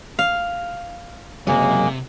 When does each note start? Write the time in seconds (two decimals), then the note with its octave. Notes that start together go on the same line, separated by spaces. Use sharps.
0.19 F5
1.47 F#1 C3 F#3 G#3 A#3